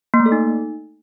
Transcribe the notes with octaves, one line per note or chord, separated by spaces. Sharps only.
A#3
A3
A4
D#4